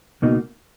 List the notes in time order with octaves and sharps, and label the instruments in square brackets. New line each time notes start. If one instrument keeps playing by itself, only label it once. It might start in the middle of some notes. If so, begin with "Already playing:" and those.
[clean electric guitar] C#2 B2 A#3 D#4 F#4